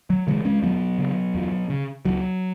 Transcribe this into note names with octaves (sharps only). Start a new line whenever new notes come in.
F#3
C#3 E3 G#3
G#3 C#4
E2 F#3 B3
C#3
E2
C#3
C#2 F#3